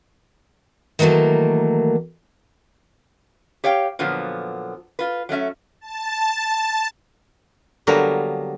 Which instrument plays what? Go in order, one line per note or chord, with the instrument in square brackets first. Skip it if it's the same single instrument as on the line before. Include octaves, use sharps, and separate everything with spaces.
[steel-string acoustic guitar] D#3 E3 F#3 A3 A#3
[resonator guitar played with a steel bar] G4 C#5 F5 G5
A#2 D3 F3 F#3 B3
F4 B4
F#3 A3 C#4 E5
[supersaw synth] A5
[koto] D3 F#3 G3 A#3 B3 A#4